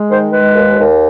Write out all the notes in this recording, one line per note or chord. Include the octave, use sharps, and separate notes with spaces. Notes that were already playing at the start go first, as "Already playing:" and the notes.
Already playing: G#3
D#3 C5
G#3 B4
D#2
D#2